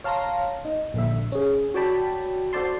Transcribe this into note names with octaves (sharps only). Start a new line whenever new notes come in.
C#5 F5 A5 A#5 C6 A#6
D#4
A#1 D3 E5
C#4 G#4
F#4 C#5 D5 G5 A5 B5
F#4 A4 C5 D5 A5 C6